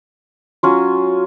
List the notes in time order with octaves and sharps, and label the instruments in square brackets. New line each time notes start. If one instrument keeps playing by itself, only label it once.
[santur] F#3 C#4 F4